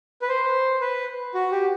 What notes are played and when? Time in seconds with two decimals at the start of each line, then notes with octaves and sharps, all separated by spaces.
0.22 B4
0.29 C5
0.81 B4
1.34 F#4
1.51 G4